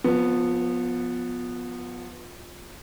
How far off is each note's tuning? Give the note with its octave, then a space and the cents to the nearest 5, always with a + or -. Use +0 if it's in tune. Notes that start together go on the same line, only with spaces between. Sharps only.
F3 +25 B3 -5 A#4 +45